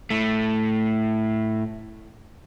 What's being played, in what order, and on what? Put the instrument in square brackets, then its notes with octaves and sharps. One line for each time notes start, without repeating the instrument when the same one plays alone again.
[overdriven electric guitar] A2 A3